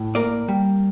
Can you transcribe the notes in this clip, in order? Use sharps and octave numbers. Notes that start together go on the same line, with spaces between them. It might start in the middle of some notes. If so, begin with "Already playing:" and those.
Already playing: A2
A#3 A#4 D5
G3